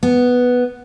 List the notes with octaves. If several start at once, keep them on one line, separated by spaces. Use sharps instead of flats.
B3